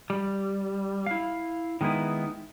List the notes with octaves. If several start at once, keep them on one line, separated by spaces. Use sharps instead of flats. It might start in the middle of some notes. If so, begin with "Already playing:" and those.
G3
E4 F5
D#3 G#3 B3 D#4 E4